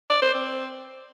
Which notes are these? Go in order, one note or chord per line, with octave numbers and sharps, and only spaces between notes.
D5
C5
C4